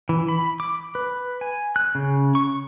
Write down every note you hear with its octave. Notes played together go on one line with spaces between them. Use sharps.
E3
B5
D6
B4
G#5
F#6
C#3
C#6